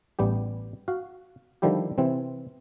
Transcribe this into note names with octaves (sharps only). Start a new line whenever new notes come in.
A1 G3 B3 G4
F#4 F5
D3 D#3 F3 G3 E4 G4
C3 E3 C4